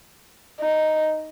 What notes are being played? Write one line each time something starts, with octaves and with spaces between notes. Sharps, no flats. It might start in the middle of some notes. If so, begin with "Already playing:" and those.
D#4